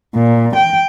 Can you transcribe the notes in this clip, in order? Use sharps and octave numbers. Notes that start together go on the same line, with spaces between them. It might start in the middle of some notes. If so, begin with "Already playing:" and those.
A#2
G5